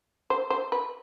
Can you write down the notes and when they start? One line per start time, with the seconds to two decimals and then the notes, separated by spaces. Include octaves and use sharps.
0.30 C5
0.50 C5
0.72 B4